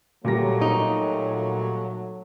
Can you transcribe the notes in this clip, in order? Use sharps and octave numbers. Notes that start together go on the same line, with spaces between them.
A#2 F#3 G3 A3 A#6
D#4